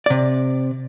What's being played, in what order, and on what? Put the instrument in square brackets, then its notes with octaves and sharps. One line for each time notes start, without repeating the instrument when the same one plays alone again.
[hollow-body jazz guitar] C3 D5